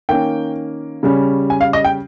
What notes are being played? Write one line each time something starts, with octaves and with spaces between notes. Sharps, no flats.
D#3 A#3 C#4 G5
C#3 G3 C#4
G#5
F5
D#5
G5